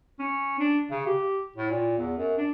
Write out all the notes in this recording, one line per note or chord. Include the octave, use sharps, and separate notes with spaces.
C#4
D4
C#3
G4
A2
A#2
E2
F#2
D4